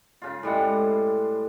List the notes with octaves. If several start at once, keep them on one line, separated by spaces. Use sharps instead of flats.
C#3 F4
A2 G3 G#3 F#5